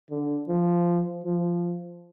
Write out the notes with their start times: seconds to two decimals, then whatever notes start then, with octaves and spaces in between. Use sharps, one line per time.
0.11 D3
0.48 F3
1.24 F3